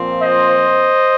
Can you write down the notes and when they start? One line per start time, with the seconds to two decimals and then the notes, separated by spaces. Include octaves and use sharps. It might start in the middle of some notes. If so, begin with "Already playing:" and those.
Already playing: A#2 F3 C4
0.22 C5 D#5